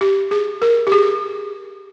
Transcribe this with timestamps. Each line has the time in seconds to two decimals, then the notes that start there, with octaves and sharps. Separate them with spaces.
0.01 G4
0.31 G#4
0.62 A#4
0.87 G4
0.92 G#4